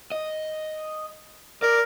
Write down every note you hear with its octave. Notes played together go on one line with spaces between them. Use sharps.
D#5
A#4 D5